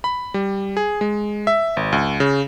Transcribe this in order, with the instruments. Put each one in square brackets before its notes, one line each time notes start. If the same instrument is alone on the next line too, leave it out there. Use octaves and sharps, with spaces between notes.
[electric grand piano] B5
G3
G#4
G#3
E5
G#1
C#2
C#3